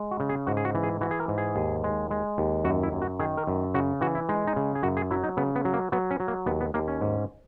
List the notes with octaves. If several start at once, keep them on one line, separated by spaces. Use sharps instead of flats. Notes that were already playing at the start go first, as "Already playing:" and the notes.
Already playing: G#3
F#4
C#3
G#4
G#2 F#4
G#4
F#4
E3
G#4
E3 F#4
G#4
A#4
G#2
G#4
D#2
G#3
G#3
D#2
F#2 F#4
E4
F#2
F#4
D#3 G#4
A#4
F#2
C#3 F#4
E3 F#4
E4
G#3 D#4
D#4
C#3
G#4
F#2 F#4
G#4
F#3 E4
D#4
C#3 B3
B3
F#3
A#3
F#3 B3
C#4
F#3
A#3
D#2 B3
B3
D#2 A#3
C#4
G#2